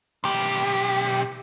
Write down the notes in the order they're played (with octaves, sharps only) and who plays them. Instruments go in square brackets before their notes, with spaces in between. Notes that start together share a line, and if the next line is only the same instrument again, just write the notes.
[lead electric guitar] B1 G4